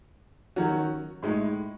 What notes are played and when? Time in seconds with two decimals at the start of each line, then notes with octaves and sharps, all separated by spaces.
0.56 D#3 F#3 C#4 F#4
1.23 A2 G#3 D#4